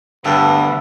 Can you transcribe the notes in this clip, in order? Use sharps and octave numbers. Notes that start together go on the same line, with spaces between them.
D2 G2 B3 A4 F#5